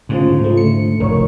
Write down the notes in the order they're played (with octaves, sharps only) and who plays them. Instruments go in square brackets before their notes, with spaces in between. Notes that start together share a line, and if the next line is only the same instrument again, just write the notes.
[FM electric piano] D2 C#3 F3 [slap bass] G#2
[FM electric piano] C#2 F3 A3
[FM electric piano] D3 C#7 [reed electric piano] A3
[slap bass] F1 [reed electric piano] A#4 C#5 C#6